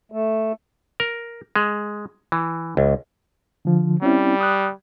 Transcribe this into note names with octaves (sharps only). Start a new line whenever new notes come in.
A3
A#4
G#3
E3
C#2
D3 F3
G3 C4 C#4 E4
D#6 F#6